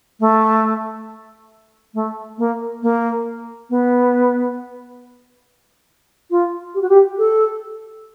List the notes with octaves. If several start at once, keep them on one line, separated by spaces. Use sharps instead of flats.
A3
A3
A#3
A#3
B3
F4
G4
F#4
G4
A4